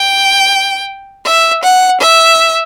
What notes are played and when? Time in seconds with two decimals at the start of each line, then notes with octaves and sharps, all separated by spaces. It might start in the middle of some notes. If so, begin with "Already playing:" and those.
Already playing: G5
1.26 E5
1.64 F#5
2.00 E5